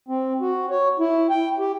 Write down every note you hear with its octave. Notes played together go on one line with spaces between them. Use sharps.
C4
F#4
C#5
E4
G5
G4